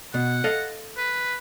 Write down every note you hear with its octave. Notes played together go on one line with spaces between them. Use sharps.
B2 F#5
A4 D#5 F5
B4